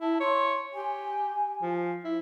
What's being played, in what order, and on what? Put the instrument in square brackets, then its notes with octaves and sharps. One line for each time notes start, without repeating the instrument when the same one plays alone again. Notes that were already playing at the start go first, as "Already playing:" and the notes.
[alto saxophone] E4 [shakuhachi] A5
[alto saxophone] C#5 [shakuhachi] C6
[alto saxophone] G4 [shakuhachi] G#5
[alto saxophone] F3
E4